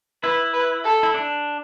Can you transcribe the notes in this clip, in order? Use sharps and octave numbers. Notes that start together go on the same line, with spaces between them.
E4 B4
B4
A4
E4
D4